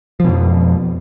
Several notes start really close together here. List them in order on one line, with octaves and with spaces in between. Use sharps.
F3 B2 F2